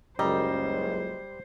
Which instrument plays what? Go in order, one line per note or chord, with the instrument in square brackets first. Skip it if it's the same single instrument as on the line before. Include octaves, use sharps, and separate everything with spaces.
[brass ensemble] F#1 C#2 F#2 [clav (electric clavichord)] G3 [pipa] D#4 [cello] C5